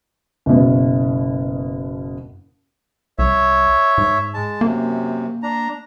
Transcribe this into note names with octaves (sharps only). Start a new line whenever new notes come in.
F#1 B2
C2 C#5 E5
G#2
G#3 A5
F#2 C3 A#3
D4 A#5